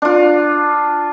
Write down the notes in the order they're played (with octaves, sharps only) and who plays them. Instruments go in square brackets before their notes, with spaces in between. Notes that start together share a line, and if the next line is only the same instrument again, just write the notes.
[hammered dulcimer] D4 F4